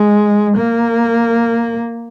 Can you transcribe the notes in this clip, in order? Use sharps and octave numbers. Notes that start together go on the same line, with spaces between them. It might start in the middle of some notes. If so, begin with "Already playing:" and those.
Already playing: G#3
A#3